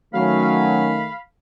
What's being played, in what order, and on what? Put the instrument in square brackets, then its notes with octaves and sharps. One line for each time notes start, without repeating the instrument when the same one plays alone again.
[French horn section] D#3 A3 [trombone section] F#3 C#4 [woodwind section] F5 B5